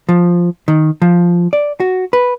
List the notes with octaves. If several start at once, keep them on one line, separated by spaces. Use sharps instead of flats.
F3
D#3
F3
D5
F#4
B4